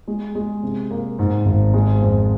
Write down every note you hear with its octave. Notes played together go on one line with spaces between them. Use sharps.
G#3
G#3
C3
A#3
G#2
G#1
G#3
F2